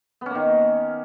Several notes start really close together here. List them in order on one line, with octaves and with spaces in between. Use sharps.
B3 C#4 A#3 D#3